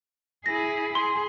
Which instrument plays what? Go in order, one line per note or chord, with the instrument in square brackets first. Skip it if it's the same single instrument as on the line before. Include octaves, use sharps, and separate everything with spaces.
[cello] E4 G#4 [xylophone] A#6
[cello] G#4 [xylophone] C6